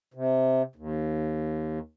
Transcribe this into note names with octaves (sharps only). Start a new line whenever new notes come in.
C3
D#2